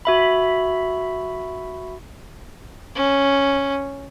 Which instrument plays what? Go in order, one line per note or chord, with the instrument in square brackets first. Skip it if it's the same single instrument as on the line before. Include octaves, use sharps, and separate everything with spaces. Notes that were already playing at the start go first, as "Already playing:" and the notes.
[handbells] F#4 E5 B5
[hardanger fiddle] C#4